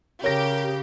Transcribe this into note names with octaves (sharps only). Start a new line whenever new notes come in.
C#3 G4 A#4 C#5 A#6